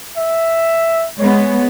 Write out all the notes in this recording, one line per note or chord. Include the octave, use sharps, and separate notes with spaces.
E5
G#3 B3 C#5